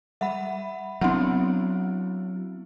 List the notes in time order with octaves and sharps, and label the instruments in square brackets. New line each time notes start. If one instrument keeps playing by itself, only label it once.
[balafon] G3 [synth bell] E5 F#5 B5
[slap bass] F#3 D4 [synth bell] B3 C4 E4 [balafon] F#5 C6